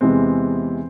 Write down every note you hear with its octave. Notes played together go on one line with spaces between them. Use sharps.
E2 C3 E3 G#3 C4